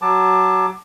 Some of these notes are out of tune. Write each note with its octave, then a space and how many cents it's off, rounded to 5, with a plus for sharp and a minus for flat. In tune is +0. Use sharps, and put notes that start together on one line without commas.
F#3 +20 A5 +0 D6 +20